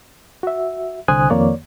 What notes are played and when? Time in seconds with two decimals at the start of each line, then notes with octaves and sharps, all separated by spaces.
0.43 F#4 E5
1.08 C2 D3 C5 G#5 D#6 F#6
1.30 F2 D#3 A#3 C#5 D5